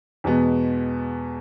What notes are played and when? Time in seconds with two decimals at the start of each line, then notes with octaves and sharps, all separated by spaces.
0.24 E2 B2 G#3 B3